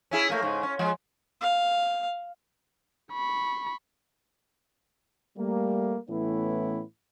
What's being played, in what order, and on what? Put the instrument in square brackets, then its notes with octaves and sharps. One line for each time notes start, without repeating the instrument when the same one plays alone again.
[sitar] C#4 E4 G#4
A3 A#3
G#2 C#3
C#4
F3 G#3
[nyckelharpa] F5
[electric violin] B5 C#6
[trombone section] G3 A3 A#3
A2 E3 A3 B3 C#4 E4